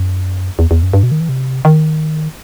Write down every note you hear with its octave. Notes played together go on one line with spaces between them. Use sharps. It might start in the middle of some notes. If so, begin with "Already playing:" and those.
Already playing: F#2
E2
E2
F#2
G2
B2
D#3
E3
C3
D#3